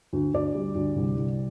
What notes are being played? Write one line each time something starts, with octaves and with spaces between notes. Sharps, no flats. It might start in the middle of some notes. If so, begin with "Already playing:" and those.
D2
D2 D5
G3
D2
C2
C2